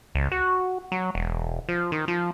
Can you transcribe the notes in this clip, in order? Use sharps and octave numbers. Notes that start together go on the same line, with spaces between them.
C#2
F#4
F#3
E1
F3
D#3
F3